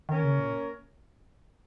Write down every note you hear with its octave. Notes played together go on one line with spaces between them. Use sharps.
D#3 A#3 C#4 A#4 C#5
C#3
A#2